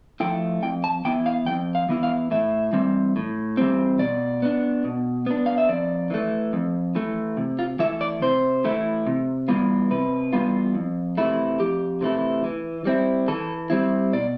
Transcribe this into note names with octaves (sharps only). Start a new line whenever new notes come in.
F3 A3 E4 G5
F2 G5
A5
E3 B3 E4 G5
F5
F2 G5
F5
E3 B3 E4
F5
A2 E5
E3 G3 C4
A2
E3 G3 C4
B2 D5
B3 D4
B2
B3 D4
F5
E5
F2 D5
E3 A3
F2
E3 A3
C3
F4
E3 A3 E4 E5
D5
C3 C5
E3 A3 E4
C3
E3 G3 B3 F4
C3 B4
E3 G3 B3 F4
F2
C3 E3 A3 E4
F2 G4
C3 E3 A3 E4
E3
G3 C4 E4
E3 A4
G3 C4 E4
B2 D5